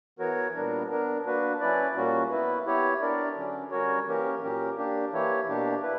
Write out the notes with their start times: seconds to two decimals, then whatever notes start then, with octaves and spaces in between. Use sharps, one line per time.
0.19 E3 B3 F#4 A#4 C#5
0.55 A#2 G3 B3 D4 A#4
0.90 B3 D4 A#4
1.26 A#3 D4 F#4 B4
1.61 F#3 C#4 E4 B4 D5
1.95 A#2 G3 A#3 C#4 F#4
2.31 B3 E4 B4
2.66 B3 E4 G4 C#5
3.01 B3 D4 A#4 D5
3.36 D3 F#3 C#4
3.71 G3 C#4 F#4 A#4 C#5
4.06 E3 A#3 C#4 G4 A#4
4.42 A#2 F#3 C#4 G4 A#4
4.77 A#3 D4 G4
5.13 E3 A#3 E4 G4 C#5
5.47 B2 A#3 D4 G4
5.83 E4 B4